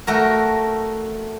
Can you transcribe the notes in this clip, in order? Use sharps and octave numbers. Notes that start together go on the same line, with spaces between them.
A3 F#4 A#4